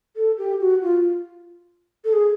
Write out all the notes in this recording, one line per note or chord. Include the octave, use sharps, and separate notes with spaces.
A4
G4
F#4
F4
A4
G#4